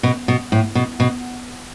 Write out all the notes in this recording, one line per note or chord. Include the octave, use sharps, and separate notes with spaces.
B2
B2
A2
B2
B2